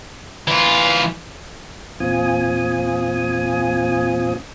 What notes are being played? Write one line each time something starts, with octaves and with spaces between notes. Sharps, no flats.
E3 F4
E2 A#2 C4 F4 G#5 D#6